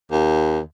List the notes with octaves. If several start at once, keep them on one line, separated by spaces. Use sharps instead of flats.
D#2